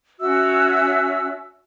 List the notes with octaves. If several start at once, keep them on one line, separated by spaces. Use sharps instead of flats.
C#4 F#4 E5 E6